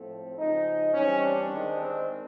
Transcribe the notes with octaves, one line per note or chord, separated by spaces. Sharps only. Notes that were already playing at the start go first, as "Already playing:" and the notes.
Already playing: A2 F3 A3 C4
C#3 F3 G#3 D#4
E3 G3 C4 C#4
D4
D#3 G#3 C4
C4